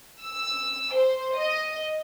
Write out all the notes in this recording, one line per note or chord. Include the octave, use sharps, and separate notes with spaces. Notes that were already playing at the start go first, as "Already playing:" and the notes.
E6
C5
D#5